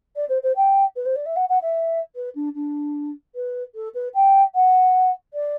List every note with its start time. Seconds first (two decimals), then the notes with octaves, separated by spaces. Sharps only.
0.15 D5
0.28 C5
0.42 C5
0.55 G5
0.95 B4
1.05 C5
1.15 D5
1.25 E5
1.36 F#5
1.49 F#5
1.62 E5
2.15 B4
2.35 D4
2.54 D4
3.34 B4
3.74 A4
3.94 B4
4.14 G5
4.54 F#5
5.33 D5